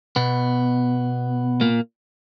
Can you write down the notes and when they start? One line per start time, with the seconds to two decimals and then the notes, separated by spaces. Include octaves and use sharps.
0.16 B2 B3
1.61 A#2 A#3